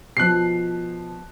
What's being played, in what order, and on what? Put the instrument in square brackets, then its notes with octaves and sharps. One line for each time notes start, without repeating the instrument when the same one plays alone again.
[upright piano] B2 F3 [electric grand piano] F#6 C7